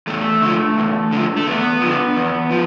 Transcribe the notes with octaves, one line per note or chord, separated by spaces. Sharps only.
E2 A3
D3 F3
E2
D3 F3
A3
E2 B3
D3 F3
E2
F3